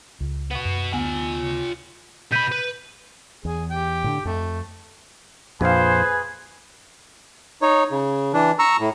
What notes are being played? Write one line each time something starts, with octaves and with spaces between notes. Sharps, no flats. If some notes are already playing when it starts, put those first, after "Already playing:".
C#2
B3 F#4
F#2
D2 B3 F4 G#5
B2 B5 G6 B6 D#7
B4
E2 G#4
G4 G5
A2 D3 D4
F2 A3
A#1 F2 G#4 B4 C5 F5 G#5
D#4 C#5
C#3
E3 D4
A#5 C#6 E6
A2